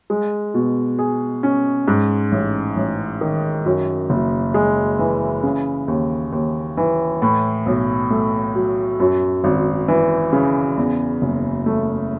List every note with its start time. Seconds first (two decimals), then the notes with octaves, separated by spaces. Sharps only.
0.10 G#3
0.54 B2
0.99 G#4
1.43 C#4
1.88 G#2
2.32 A1
2.77 A1
3.21 D#3
3.65 F#2
4.10 F#1
4.54 G#3
4.99 E3
5.43 C#3
5.88 D#2
6.32 D#2
6.77 E3
7.22 A2
7.66 B1
8.11 A3
8.55 F#3
9.00 F#2
9.44 G#1
9.88 E3
10.33 C#3
10.77 E2
11.22 F#1
11.66 A3